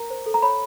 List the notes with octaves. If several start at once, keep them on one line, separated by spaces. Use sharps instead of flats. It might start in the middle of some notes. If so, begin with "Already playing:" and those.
Already playing: A#4 A#5
C5
A4
A#5
C#5 B5